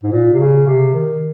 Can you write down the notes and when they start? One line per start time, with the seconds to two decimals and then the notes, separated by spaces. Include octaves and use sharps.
0.03 G#2
0.13 A#2
0.33 C3
0.39 C#3
0.67 C3
0.94 D#3